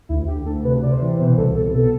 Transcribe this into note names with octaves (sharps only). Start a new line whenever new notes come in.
D2 E4
D2 G4
D2 A4
C3 B4
C3 D5
C5
E3
B2 C5
C2 A4
C2 A4
B2 A4